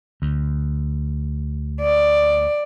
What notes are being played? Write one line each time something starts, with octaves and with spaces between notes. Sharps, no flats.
D2
D5